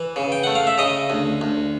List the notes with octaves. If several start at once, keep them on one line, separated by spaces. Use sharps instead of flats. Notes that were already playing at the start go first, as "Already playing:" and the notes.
Already playing: E3
C#3
G5
A3 F#5
F5
E5
C#3 D#5
D2
D2